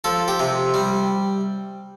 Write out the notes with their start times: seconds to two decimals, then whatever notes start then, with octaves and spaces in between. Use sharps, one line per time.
0.04 F3 A4
0.28 G4
0.39 C3
0.74 G3